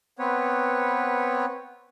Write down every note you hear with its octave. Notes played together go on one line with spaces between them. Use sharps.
B3 C4 B4 C#5